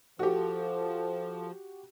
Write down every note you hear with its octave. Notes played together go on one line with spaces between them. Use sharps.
F3 F#4 G4 A4